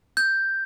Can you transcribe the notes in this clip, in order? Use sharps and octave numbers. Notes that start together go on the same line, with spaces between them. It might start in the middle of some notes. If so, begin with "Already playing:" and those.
G6